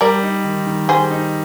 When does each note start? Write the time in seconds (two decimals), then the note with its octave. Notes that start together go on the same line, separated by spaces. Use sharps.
0.01 G3 A#4 D5
0.23 D#4
0.44 D#3
0.67 D#3
0.88 G3 G#4 C5
1.11 D#4